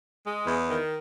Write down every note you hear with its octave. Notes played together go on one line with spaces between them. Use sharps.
G#3
E2
D#3